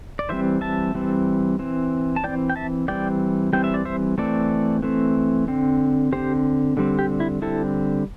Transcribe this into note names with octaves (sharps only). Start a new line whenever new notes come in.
D5
E3 G3 C4 C5 E5
E5 A5
E3 G3 C4
E3 C4
A5
E3 C4 D5 G5
G5
E5 A5
E3 G3 C4 D5 G5
E3 G3 C4 G5
E5
D5
C5 E5
E3 A3 C4 A4 D5
E3 A3 C4
D3 C4
D3 C4 G4 C5
D3 G3 C4
G4
E4
D3 G3 C4 E4 A4